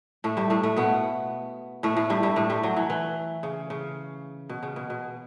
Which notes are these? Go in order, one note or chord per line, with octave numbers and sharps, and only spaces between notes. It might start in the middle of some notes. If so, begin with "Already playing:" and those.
A2 A3
G2 G3
A2 A3
A2 A3
B2 B3
A2 A3
A2 A3
G2 G3
G2 G3
A2 A3
G2 G3
F#3
E3
E3
C#3
C#3
B2
C#3
B2
B2